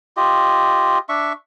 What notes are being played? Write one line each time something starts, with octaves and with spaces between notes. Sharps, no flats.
F4 G4 D#5
D4 E5 C#6